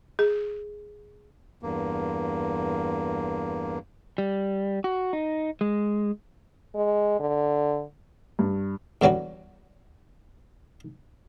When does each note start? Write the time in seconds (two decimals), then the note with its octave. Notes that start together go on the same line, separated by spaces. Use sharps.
0.19 G#4
1.63 E2 G2 A#3
4.18 G3
4.84 F#4
5.13 D#4
5.61 G#3
6.75 G#3
7.20 D3
8.39 G2
9.02 E2 D3 F#3 G3 F#4